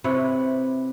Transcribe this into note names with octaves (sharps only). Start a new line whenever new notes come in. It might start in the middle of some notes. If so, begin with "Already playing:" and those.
C3 E4 B4 C#5